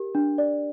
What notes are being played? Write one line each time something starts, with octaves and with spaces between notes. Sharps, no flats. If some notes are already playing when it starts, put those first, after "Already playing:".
Already playing: G4 A#4
D4
D5